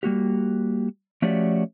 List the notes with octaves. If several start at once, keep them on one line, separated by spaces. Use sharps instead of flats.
G3 A#3 F#4 G4
F3 A3 C#4 F#4 G4 D5